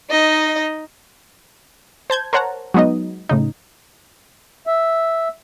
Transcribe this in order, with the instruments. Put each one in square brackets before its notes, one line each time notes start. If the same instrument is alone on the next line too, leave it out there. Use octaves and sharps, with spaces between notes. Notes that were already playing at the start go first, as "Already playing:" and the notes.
[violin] D#4 D#5
[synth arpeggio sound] C5 A5 G6 G#6
A#4 C5 C#5 F#5 A5 A#5
F#3 G#3 B3 D#4 D#5
A2 C#3 D#4
[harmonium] E5